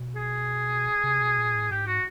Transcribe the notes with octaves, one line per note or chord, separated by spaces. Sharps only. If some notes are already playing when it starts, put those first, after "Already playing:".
Already playing: B2
G#4
C3
B2
A#2
A2
G#2 G4
F#4